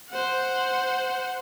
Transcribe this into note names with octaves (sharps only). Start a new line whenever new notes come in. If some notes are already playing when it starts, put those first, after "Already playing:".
C5 F#5